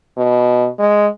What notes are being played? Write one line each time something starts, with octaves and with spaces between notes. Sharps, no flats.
B2
G#3